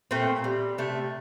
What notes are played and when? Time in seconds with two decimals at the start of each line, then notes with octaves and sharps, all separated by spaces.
0.11 A#2 A3 C4
0.44 G3
0.78 C3 A3